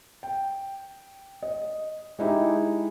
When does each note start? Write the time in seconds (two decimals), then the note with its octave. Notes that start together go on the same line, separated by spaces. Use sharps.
0.23 G5
1.43 D#5
2.19 G#3 D#4 E4 G4